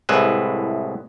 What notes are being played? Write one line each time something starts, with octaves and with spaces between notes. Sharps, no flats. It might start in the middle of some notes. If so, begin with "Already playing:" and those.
C2 A2 G#3 B4 E5